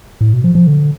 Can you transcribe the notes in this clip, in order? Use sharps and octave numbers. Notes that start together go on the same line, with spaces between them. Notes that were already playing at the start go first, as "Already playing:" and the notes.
A2
B2
F3
F3
D3